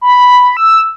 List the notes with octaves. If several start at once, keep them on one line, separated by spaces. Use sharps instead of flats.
B5
E6